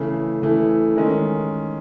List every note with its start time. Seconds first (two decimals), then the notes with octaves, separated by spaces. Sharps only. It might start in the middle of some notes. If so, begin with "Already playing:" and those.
Already playing: C#3 E3 A3
0.42 C#3 E3 A3
0.96 D#3 G#3 C#4